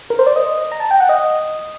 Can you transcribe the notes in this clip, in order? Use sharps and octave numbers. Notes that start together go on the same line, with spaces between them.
A#4
C5
D5
D#5
A#5
A5
G5
F#5
D#5